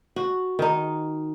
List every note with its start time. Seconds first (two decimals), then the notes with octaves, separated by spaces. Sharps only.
0.16 F#4
0.59 D#3 D#4